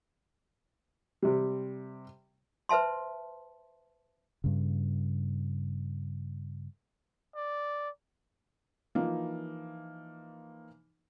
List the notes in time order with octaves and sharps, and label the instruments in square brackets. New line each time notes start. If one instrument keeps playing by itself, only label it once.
[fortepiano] C3 G3
[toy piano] B4 C5 E5 A5 C6
[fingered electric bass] G2 C#3
[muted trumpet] D5
[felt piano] E3 F3 A#3 D#4